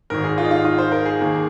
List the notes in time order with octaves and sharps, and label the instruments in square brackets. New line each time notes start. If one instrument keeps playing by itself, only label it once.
[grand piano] G#1 G#2 D#3 A#4
G#4
F4
D#4
F4
F4
C5
A#4
G#4
D#2 D#3 A#3